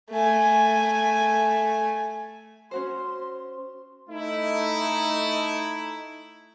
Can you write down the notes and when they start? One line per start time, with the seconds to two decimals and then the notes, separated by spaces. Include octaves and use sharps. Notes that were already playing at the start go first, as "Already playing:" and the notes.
0.10 A3 G#5
2.71 C#4 F#4 C5 C6
4.09 A3 D#4 E4